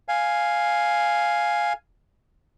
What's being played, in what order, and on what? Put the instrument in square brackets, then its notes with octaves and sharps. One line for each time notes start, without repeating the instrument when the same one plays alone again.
[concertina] F5 G#5